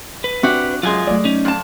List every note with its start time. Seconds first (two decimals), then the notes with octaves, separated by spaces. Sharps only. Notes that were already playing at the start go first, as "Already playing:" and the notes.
0.24 B4
0.43 C4 D4 F#4 G4 E5
0.83 F#2 F#3 G#3 F4 G#5
1.07 F#3 A3 D5
1.25 C#4 D#4
1.45 F2 A5